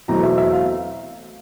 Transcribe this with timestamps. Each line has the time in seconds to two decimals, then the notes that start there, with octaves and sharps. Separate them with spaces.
0.08 E2 B2 F#3 A3 C4 A#5
0.23 E5
0.38 E5
0.52 F5